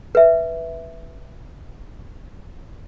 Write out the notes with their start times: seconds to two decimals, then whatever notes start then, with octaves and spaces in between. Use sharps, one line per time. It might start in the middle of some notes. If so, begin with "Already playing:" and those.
0.15 B4 E5